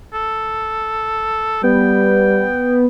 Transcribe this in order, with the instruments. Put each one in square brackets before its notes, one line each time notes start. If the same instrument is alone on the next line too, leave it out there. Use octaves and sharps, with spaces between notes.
[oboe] A4
[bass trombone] G3 [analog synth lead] B3 [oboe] G5